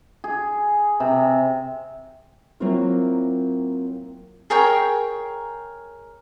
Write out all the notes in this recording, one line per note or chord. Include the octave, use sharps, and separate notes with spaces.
G#4
C3
F#3 A#3 C4 E4 F4 A#4
G#4 A#4 C#5 G5